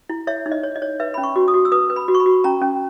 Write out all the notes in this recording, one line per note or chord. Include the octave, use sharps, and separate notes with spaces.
E4
C#5 E5
D#4
D#5
C#5
D#5
C#5
B4 E5
C#4 B5
C#6
F#4
D#6
F#4
E6
B4 D#6
B4
B5
F#4
C#6
B5
F#4
C#4 A#5
C#4